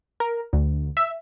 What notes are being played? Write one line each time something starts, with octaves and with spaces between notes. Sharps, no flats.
A#4
D2
E5